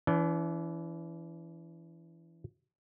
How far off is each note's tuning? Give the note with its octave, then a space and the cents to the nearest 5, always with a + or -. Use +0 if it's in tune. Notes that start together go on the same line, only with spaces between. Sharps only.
E3 +10 D4 -45